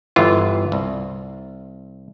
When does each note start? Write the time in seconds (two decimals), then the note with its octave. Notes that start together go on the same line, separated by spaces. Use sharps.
0.16 G1 E3 F4
0.72 C2